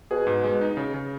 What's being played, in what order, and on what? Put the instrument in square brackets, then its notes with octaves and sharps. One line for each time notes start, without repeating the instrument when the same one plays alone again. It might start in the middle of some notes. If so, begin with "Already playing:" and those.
[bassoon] B2 [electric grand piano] G#4
[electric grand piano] G#2
G#3
D#4
C#3
C#3